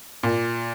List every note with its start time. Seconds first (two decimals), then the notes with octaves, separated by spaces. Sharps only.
0.23 A#2